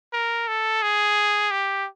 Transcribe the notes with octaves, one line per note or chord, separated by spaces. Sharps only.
A#4
A4
G#4
G4